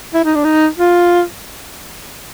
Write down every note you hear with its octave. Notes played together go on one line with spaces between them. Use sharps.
E4
D#4
D4
D#4
F4